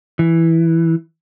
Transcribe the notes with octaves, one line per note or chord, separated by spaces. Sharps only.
E3